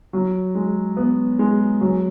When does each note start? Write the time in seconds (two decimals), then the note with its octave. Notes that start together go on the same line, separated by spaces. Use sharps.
0.13 F#3
0.55 G#3
0.97 B3
1.39 G#3
1.81 F#3